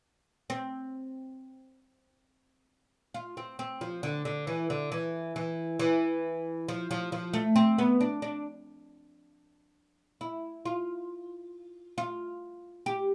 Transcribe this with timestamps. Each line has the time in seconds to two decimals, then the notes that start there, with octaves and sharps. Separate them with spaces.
0.50 C4
3.14 F4
3.37 C4
3.59 C4
3.81 F3
4.03 D3
4.25 D3
4.47 E3
4.70 D3
4.92 E3
5.36 E3
5.79 E3
6.68 F3
6.91 F3
7.12 F3
7.34 A3
7.56 C4
7.78 B3
8.01 D4
8.22 D4
10.21 E4
10.65 F4
11.98 F4
12.86 G4